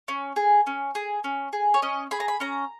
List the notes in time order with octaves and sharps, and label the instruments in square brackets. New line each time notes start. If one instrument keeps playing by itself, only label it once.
[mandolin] C#4
G#4
C#4
G#4
C#4
G#4
C#5
C#4 D#5
G#4 B5
A#5
B5
C#4 A#5